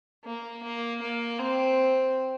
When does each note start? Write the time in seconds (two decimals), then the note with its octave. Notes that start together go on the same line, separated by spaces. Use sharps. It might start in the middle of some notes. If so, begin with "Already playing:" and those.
0.24 A#3
0.63 A#3
1.01 A#3
1.39 C4